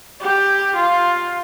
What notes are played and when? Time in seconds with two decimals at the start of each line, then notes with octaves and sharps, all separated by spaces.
0.21 G4
0.75 F4